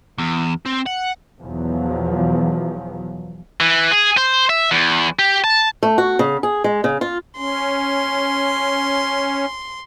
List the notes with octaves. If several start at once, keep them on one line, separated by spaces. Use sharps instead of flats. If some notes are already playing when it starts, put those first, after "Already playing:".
E2
C4
F#5
E2 B2 F3 F#3
E3
G#4
C5
E5
E2
G4
A5
A3
F#4
C#3
G#4
G#3
C#3
F4
C#4 C6